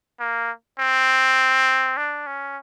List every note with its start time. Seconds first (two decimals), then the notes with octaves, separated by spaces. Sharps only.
0.20 A#3
0.79 C4
1.97 D4
2.26 C#4